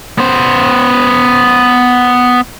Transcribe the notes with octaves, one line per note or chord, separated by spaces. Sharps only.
B3 C5